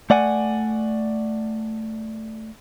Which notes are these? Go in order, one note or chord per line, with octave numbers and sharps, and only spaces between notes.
A3 D5 F#5 G#5